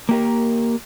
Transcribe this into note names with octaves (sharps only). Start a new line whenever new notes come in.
A#3 G4 A#4